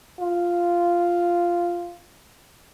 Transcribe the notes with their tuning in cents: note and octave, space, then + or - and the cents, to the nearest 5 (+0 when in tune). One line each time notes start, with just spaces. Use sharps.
F4 -5